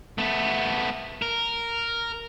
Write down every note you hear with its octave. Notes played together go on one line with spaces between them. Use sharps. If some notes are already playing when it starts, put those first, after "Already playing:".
A3 B3
A#4